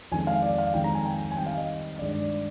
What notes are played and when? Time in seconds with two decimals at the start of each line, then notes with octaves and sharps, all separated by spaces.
0.12 F2 D#3 G#3 G#5
0.27 F5
0.42 D5
0.58 F5
0.74 F2 D#3 G#3 G5
0.84 A#5
0.95 G#5
1.05 G5
1.31 G#5
1.36 D#3 G3 C4 G5
1.46 F5
1.57 D#5
1.99 G2 D#3 G#3 D4 D5
2.09 D5
2.20 D5